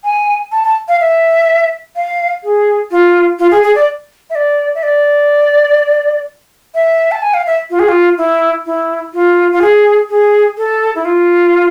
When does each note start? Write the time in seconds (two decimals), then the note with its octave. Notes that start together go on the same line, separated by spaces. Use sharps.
0.04 G#5
0.52 A5
0.64 A5
0.88 F5
1.00 E5
1.96 F5
2.44 G#4
2.91 F4
3.39 F4
3.51 G#4
3.63 G#4
3.75 D5
4.30 E5
4.35 D5
4.75 E5
4.83 D5
6.75 E5
7.11 A5
7.22 G#5
7.34 F5
7.47 E5
7.70 F4
7.79 G#4
7.88 F4
8.18 E4
8.66 E4
9.14 F4
9.52 F4
9.61 G#4
10.10 G#4
10.57 A4
10.95 E4
11.05 F4